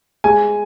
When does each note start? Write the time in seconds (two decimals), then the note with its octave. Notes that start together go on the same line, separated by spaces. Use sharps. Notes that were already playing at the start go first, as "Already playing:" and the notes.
0.24 G#3 G#5